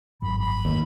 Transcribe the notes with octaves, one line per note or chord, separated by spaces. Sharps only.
G#1 F#2 F3 B5
B5
D#2